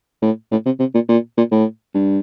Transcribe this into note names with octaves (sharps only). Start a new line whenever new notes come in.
A2
A2
C3
C3
A#2
A#2
A#2
A2
G2